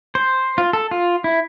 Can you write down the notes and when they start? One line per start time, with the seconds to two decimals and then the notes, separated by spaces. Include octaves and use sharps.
0.15 C5
0.58 F4
0.73 A4
0.91 F4
1.24 E4